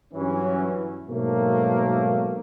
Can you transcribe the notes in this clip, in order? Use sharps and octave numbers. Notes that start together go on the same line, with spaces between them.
G2 E3 F#3 C#4
G#2 B2 F#3 A3 A#3